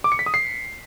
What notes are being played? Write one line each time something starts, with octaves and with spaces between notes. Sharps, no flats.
D6
C#7
B6
D#6
C7